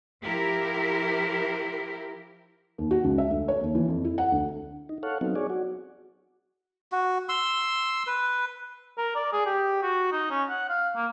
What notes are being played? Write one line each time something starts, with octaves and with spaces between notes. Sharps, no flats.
F3 E4 G4 A#4
D#2
F#4
C#2
E5
D2
C#5
D#2
E3
F2
E4
F#5
D2
D#4
A4 C#5 F5 F#5
F#3 B3 C4 D#4
G#4 C#5 D5
F#4
F#4
C6 E6
B4
A#4
D5
G#4
G4
F#4
D#4
C#4
F#5
F5
A#3